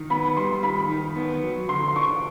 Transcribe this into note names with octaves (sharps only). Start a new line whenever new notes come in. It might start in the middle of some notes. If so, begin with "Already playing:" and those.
Already playing: D#3
B3 B5
G3 C6
D#3 B5
D#3
B3
F#3
D3 C6
C6
D4 C#6